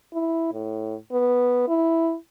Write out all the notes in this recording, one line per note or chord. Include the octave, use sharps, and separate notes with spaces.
E4
A2
B3
E4